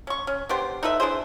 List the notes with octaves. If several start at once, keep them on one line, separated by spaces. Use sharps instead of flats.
C#4 C#6
C#4
B3 D4 G4 C5
D#4 A4 B4 E5
D4 E4 G#4 C5